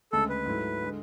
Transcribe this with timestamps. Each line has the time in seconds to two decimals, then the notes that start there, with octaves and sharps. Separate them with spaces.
0.12 D2 C#3 G#3 A4
0.29 B4
0.46 G#2 F#3 A3 E4
0.82 D3 G#3